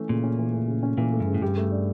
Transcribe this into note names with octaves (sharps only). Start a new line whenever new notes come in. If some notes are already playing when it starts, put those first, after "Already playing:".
Already playing: E3 A3 C#4
A#2 C#3
C#4
E3
A3
C#3
C#4
A#2 E3
A3
G2
C#3
A2
G2 G4
A3
D4